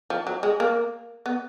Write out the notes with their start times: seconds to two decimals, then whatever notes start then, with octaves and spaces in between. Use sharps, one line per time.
0.10 F3
0.27 F#3
0.43 G#3
0.60 A#3
1.26 B3